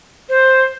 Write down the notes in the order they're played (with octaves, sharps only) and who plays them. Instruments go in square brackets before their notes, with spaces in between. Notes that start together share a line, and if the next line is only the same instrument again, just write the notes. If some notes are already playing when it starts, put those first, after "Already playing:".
[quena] C5